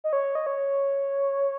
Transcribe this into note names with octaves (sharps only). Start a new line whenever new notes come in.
D#5
C#5
D#5
C#5